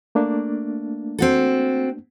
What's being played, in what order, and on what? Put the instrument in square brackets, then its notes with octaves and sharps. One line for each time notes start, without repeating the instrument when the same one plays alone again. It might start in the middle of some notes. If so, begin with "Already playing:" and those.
[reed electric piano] A3 A#3 D4
[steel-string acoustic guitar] C4 F#4 A4